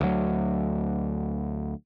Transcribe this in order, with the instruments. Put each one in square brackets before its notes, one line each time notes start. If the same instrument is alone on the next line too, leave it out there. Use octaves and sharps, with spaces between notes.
[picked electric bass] D2 F#3